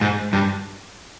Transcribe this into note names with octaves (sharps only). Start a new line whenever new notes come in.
G#2
G2